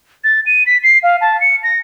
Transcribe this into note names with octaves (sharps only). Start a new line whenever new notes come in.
A6
D#7
B6
C7
F5
A5
C#7
A#6